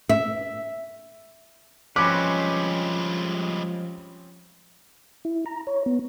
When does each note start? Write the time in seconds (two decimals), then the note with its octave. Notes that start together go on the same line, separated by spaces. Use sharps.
0.09 E5
1.96 F3 G3 G#3 C4 C#4 B4 D6
5.25 E4
5.46 A#5
5.67 C#5
5.86 B3